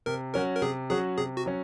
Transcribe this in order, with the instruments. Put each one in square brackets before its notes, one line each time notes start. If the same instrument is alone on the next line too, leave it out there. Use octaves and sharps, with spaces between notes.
[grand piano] C3 [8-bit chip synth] A#4
[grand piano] F#3 C#4 F#4 [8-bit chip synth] A#4
[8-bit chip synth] A#4
[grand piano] C3 [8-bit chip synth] G#4
[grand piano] F#3 C#4 F#4 [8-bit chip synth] G#4
[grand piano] C3 [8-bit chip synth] G#4
[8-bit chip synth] F#4
[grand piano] F#3 C#4